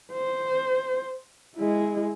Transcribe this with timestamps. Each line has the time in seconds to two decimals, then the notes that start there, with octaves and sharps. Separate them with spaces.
0.12 C5
1.56 G#3 E4